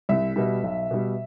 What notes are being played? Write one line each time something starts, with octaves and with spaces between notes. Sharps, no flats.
C2 E5
B2 G3
B1
B2 G3